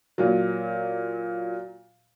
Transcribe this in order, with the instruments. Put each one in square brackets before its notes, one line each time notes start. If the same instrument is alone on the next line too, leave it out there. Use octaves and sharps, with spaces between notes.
[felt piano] A#2 F#3